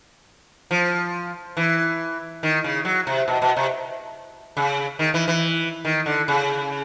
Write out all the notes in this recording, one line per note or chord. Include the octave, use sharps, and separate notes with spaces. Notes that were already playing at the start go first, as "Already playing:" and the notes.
F3
E3
D#3
C#3
F#3
C3
B2
B2
C3
C#3
D#3
E3
E3
D#3
D3
C#3